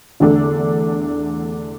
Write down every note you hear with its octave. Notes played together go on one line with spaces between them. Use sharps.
E2 D3 A3 D4 A4